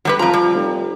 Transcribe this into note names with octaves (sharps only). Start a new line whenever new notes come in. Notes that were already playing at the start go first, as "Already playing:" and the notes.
F#3 G3 B4
F2 F3 A#5
G3
F1